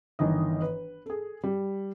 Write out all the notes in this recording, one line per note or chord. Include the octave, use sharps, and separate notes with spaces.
G1 D#3 E3 D#5
B4
G#4 A4
G3